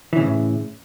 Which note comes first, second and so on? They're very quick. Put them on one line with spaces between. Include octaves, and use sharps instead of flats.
E3 C#3 A2